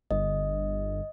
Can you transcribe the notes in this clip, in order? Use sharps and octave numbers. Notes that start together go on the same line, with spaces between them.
G1 D#5